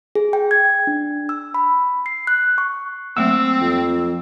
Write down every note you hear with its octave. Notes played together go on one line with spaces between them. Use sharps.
G#4
G5
G#6
D4
E6
B5
C7
F#6
C#6
F#3 A3 A#3 C4 E6
F2